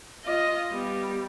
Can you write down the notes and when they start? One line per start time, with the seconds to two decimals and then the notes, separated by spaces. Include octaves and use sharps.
0.25 F4 D#5
0.72 G3 B3